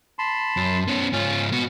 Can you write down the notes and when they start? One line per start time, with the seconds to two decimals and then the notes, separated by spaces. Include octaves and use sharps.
0.19 A5 B5 C6
0.57 F#2
0.88 B3 C#4
1.13 G#2 C#4 F4
1.52 B3 F#4